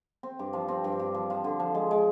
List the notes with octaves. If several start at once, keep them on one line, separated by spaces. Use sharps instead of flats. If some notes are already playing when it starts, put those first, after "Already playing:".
C4
G2
F3
C4
G2
G2
F3
F3
D3
F3
G#3
G#3